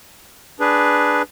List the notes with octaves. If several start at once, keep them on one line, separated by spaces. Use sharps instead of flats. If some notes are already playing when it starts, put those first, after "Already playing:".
D4 G#4 B4